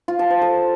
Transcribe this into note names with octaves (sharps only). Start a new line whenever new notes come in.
F4
A5
C5
A4